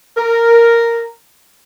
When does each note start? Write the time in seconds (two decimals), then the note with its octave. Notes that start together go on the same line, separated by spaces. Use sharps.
0.17 A#4